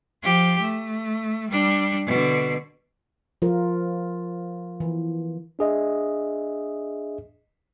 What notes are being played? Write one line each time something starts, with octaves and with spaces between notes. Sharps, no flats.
F3 G4
A3
G3 D4
B2 D3
F3 F4 A#4
E3
D4 G#4 D#5 E5